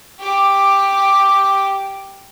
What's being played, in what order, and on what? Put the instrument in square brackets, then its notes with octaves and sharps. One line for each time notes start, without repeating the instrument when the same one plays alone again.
[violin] G4 D6